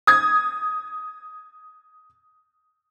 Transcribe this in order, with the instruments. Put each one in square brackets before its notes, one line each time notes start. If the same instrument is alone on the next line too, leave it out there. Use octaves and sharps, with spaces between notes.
[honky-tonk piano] D#6 G#6